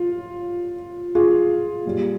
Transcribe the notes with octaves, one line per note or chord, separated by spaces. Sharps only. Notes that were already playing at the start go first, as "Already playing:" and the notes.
Already playing: F4
F4 G#4
A#2 G3